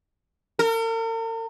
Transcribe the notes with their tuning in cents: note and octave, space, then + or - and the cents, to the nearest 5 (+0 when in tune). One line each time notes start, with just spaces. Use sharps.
A#4 -45